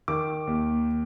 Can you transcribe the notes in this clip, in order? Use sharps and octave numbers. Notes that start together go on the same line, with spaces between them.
D#3 D6
D#2